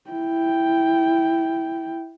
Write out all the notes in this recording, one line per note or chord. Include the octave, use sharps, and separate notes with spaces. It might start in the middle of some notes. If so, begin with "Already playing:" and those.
E4 G5